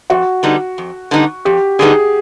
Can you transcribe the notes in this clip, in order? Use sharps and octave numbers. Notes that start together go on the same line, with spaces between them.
F2 F#4
D3 G3 B3 D#4
F2
D3 G3 B3 D#4
F2 G4
D3 G3 B3 D#4 G#4